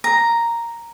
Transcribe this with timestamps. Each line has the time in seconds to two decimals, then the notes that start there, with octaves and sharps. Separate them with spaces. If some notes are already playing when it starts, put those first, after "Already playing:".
0.04 A#5